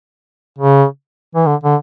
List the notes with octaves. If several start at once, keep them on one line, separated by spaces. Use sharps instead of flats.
C#3
E3
D3
D3